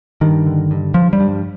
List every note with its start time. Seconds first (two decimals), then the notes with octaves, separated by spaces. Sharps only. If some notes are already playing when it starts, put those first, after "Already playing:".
0.21 G2 D#3
0.46 D3
0.71 G2
0.94 G2 F3
1.13 G3
1.20 G2